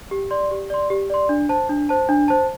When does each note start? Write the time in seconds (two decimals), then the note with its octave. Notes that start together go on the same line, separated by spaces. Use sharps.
0.11 G4
0.31 D5 C6
0.51 G4
0.70 D5 C6
0.90 G4
1.10 D5 C6
1.29 D4
1.49 C5 A5
1.69 D4
1.89 C5 A5
2.09 D4
2.28 C5 A5